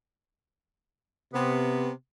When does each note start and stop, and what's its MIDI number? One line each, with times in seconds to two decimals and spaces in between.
1.33 1.89 48
1.33 1.89 59